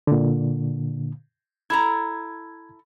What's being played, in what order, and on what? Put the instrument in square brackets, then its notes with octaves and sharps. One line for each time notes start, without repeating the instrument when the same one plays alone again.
[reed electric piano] A#2 D3
[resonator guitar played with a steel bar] E4 A4 A#5 [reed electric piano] G#6